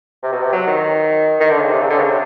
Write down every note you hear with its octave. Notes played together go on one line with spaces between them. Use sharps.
C3
B2
C3
F#3
D#3
D#3
D3
C#3
C3
C#3
D3
C#3
C3